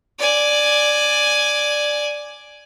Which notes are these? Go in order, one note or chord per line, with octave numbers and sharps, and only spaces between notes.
D5 G#5